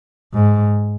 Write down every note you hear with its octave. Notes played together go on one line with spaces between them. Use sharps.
G#2